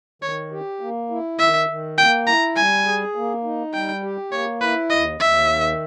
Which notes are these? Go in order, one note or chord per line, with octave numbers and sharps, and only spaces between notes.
D#3 C#5
G4
A#3
E4
D#3 E5
D#3
A#3 G5
E4 A#5
G3 G#5
G#4
A#3
D#4
G3 G5
G4
A#3 C#5
E4 B4
D#2 D#5
D#2 E5
D#3